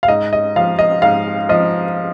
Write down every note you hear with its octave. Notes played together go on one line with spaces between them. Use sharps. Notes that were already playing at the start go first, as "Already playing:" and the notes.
F5
G#2 D#5
D#5
F3 F5
D#5
G#2 F5
F3 D#5